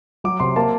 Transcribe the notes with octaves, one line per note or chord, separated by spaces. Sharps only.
F#3 D6
C3 C6
A#3 A5